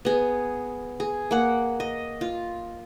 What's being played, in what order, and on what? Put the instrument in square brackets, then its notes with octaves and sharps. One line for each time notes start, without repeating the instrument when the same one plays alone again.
[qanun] B3 G#4
G#4
A#3 F#5
D#5
F4